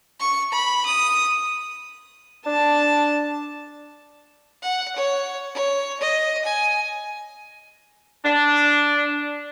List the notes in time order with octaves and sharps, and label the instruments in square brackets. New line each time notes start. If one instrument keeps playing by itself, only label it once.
[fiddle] C#6
B5
D#6
[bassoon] D4 [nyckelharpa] A5
[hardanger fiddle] F#5
C#5
C#5
D#5
G#5
[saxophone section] D4